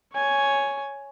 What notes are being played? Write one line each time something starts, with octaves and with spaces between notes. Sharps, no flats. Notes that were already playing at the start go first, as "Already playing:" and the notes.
C#5 G#5